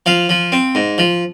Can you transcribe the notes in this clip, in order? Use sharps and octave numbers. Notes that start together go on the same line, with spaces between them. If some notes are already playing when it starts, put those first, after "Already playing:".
F3 F5
F3
C4
G#2
F3